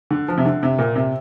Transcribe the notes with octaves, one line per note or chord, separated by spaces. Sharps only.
D3
F3
C3
D3
C3
A#2
C3